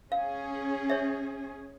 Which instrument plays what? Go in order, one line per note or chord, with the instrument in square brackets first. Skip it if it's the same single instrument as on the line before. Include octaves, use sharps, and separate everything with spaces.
[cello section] C#4 G#4 [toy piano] F5
[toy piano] C#5 E5